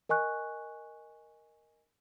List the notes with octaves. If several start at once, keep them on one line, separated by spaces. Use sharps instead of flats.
A#4 D#5 G#5 C#6 F#6